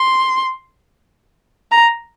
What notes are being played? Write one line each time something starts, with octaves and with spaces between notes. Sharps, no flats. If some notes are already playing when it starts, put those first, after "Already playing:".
Already playing: C6
A#5